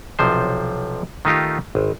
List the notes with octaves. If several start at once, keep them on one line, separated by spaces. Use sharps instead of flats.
B1 C3 F3 C5
D#3 A3 D#4 F4 G4
G#1